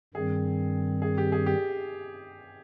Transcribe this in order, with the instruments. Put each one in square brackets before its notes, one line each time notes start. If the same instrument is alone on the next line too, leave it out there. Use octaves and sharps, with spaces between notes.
[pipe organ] G2 D#3 G3 C4 [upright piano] G#4
[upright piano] G#4
G4
G#4
G4